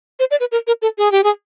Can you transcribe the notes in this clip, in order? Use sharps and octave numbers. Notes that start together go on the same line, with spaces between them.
C5
D5
B4
A#4
A#4
A4
G#4
G4
G#4